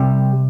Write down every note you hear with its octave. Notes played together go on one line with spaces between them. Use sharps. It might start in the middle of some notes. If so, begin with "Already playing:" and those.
Already playing: C3 G3